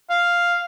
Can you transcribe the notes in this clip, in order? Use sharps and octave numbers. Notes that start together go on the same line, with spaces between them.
F5